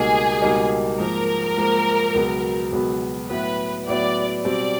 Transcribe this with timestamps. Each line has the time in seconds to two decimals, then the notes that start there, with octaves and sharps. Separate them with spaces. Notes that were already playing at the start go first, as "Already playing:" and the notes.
Already playing: C#2 B2 G3 A#3 D#4 G#4
0.42 C#2 B2 G3 A#3 D#4
0.99 G#2 F3 A#3 A#4
1.57 G#2 F3 A#3
2.14 C#2 B2 F#3 B3
2.72 C#2 B2 F#3 B3
3.30 A2 F#3 B3 B4
3.87 A2 F#3 B3 D5
4.45 B2 G3 C4 D5